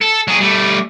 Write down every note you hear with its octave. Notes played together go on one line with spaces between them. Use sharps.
A4
F#3 G#4
G3 A3